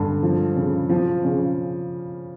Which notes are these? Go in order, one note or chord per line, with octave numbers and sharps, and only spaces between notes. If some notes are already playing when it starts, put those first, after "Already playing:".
Already playing: G2 D3
F3
C#3
F3
C#3